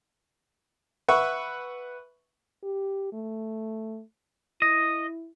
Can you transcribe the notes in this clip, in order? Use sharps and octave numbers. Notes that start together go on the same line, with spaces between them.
B4 E5 F#5 C#6
G4
A3
E4 D#5